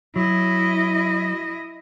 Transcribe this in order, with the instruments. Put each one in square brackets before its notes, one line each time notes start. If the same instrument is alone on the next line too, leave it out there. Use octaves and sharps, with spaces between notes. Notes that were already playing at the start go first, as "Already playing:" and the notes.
[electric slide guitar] F#3 [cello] E4 D#5